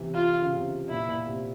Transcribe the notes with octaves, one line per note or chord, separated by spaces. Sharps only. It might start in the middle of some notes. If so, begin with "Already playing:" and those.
Already playing: C3 E3
F4
C#3
C3
A#2 E4
A#2
C3